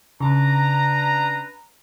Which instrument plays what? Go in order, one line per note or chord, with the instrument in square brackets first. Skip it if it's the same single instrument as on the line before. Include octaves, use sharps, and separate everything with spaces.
[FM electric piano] C#3 [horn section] D4 B4 A#5